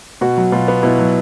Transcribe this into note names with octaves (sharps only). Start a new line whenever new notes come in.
B2 F#4
F#3
B2 F4
B3
B2 E4
F#3